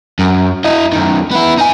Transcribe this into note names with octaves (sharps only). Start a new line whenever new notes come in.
F#2
E4 D#5
F#2 D#3
B3 E4
D#4 G#5